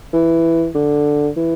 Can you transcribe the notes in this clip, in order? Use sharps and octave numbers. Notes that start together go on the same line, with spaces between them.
E3
D3
E3